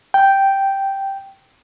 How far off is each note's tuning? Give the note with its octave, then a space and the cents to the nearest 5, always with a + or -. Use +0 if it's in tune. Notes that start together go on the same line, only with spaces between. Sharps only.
G5 -5